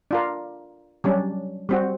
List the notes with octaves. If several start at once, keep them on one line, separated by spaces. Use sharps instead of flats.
D4 F4 A#4
F#3 G3 C#4 D4
G3 C4 F#4